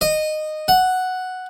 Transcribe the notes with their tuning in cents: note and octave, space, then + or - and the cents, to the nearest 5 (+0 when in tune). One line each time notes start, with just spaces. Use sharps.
D#5 -15
F#5 +0